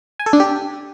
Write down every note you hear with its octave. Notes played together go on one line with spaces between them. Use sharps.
G#5
A4
D4
G4